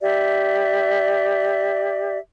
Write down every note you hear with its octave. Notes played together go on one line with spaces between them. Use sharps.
G4 D5 E5